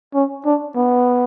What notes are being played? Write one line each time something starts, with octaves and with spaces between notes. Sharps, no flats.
C#4
D4
B3